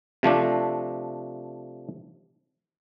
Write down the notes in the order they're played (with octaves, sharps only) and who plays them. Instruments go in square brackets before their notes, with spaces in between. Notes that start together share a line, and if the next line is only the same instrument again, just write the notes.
[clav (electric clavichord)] C3 F3 A3 D4